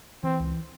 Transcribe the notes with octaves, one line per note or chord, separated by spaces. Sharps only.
E3 C4
C#2